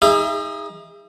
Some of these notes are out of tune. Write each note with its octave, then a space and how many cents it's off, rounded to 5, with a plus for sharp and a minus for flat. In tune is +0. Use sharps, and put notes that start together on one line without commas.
D#4 +30 G#4 -30 E5 +35